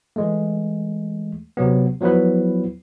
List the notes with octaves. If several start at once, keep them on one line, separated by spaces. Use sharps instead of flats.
E3 G#3 A3
C3 F#3 B3
F3 F#3 B3 E4 B4